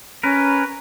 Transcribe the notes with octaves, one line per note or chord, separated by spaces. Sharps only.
C#4 A#4 B4